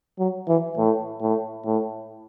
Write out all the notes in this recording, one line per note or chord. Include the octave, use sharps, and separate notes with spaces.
F#3
E3
A2
A2
A2